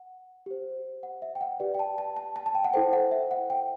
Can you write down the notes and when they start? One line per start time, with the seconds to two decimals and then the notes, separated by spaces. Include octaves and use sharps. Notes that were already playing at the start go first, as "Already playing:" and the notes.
Already playing: F#5
0.46 G4 C5
1.03 F#5
1.22 E5
1.35 G5
1.41 F#5
1.60 G4 B4 D5
1.74 G5
1.79 A5
1.98 A5
2.17 A5
2.36 A5
2.46 A5
2.55 G5
2.64 F#5
2.74 E4 A4 C5 G5
2.93 F#5
3.11 E5
3.31 F#5
3.50 G5